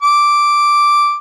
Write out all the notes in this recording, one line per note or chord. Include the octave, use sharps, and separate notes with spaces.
D6